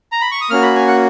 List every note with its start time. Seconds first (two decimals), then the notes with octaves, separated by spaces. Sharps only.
0.12 A#5
0.21 B5
0.31 C#6
0.41 D#6
0.50 A#3 C#4 F#4 F6
0.62 B5
0.75 G#5
0.88 F#5